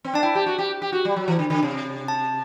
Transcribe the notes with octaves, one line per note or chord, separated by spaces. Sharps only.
C4
D4 A5
E4 G5
G4
F#4
G4
G4
F#4
G3
F#3
E3
D3
D3
C3
A5